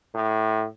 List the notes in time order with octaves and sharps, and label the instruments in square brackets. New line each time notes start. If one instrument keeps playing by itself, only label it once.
[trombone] A2